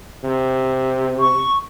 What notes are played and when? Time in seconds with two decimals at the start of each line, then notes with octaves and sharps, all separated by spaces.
0.24 C3
1.20 C#6